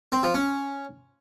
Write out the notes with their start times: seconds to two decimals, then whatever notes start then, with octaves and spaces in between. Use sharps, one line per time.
0.12 C4
0.23 F3
0.34 C#4